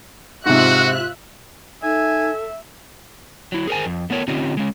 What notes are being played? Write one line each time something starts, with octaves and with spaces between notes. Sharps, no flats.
G#2 C3 F4 F#4 E5 F#6
D#4 A4 E5 G#5
F#3 E4
G#4 A#4 C5 G#5
F2
A3 B3 A4 A#4 C#5
D3 C4 C#4 D#4 F4 G4
G#3 C#4